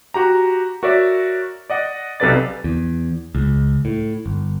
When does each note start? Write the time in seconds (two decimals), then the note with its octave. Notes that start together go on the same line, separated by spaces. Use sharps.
0.14 F#4 G4 A#5
0.83 F#4 A#4 C#5 D5 E5
1.70 D5 D#5 F#5
2.20 B1 C3 A4 B4 D5 A6
2.64 E2
3.35 C#2
3.85 A2
4.26 G1